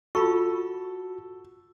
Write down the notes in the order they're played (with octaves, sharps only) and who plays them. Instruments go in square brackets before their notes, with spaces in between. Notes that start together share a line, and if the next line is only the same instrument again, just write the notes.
[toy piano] F4 B5 C#6 [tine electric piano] F#4 [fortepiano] A4